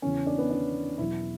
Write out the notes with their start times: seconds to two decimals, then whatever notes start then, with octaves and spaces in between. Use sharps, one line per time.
0.02 E2 C#3 E3 C#4
0.27 D4
0.38 B3
0.51 D4
0.98 E2 B2 F#3 E4